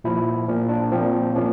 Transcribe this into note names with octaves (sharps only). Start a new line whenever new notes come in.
A#2 F3 E4
A#2 F3
D4
A#2 F3 C4
A#2 F3 C#4